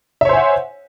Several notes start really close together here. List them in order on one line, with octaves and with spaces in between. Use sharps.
E5 C#5 C5 G#5 F#5